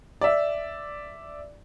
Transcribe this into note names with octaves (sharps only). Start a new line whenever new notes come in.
D5 E5